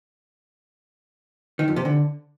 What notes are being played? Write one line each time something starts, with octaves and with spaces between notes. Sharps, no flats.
D#3
F2
C3
D3